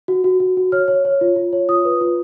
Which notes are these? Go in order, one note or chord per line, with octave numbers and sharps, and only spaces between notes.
F#4
F#4
F#4
F#4
C#5 F6
C#5
C#5
F4
F4
C#5
F4 D#6
B4
F4